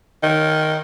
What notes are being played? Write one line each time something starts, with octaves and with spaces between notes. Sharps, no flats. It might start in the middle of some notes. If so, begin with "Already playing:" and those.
D#3